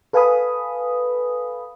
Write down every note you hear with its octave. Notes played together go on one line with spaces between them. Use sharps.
A4 B4 F5 G#5 B5 D#6